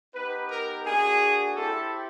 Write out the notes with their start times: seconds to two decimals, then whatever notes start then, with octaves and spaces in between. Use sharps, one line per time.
0.15 B3 D#4 G4 B4
0.51 A#4
0.85 A#3 D4 F#4 G#4
1.56 C4 E4 G4 A4